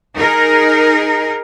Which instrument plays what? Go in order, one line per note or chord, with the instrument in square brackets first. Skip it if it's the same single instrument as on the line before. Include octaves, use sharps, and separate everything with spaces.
[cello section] D#4 G#4 A#4